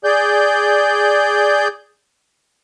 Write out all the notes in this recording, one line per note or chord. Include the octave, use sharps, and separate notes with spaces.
G#4 D5 G6